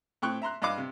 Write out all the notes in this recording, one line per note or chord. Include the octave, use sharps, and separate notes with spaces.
A2 C4 G5 C#6 F#6
E5 A#5 C6 F#6
G2 D#5 F5 B5 D6
C3